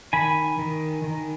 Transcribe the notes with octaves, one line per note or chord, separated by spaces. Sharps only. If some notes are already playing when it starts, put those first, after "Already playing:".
D#3 G#5 B5
D#3
D#3